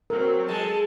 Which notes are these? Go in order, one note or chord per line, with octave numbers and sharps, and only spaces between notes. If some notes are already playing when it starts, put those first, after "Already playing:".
F#3 C4 A#4
G#3 A4 A5